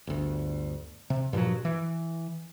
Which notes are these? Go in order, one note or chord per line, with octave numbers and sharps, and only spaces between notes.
G1 D2
C3
G2 A#2 F3 F#3
E3